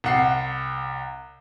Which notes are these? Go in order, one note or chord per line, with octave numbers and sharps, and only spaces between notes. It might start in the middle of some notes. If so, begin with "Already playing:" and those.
C2 F#5 C7